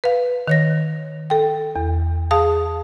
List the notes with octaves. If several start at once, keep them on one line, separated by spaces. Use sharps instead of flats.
B4 F5
D#3 C#5 A#6
A4 G5
E2
G#4 F5 A5 D#6